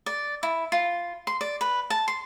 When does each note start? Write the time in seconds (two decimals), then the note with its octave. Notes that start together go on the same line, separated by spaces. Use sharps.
0.06 D5
0.43 E4
0.72 F4
1.27 C6
1.41 D5
1.61 B4
1.90 A5
2.08 C6